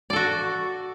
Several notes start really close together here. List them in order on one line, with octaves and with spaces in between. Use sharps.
D5 A4 F#4